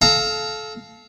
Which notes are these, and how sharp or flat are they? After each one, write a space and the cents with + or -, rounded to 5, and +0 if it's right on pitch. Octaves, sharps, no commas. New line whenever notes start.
A4 -25 F5 +0 A#5 -20